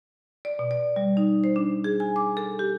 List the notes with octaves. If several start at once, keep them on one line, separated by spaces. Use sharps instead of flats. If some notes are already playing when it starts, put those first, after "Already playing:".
D5
B2
D5
G3
D#4
C5
D4
G#4
G#5
D6
A4
G4